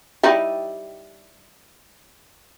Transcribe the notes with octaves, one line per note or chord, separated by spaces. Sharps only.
G3 D#4 E4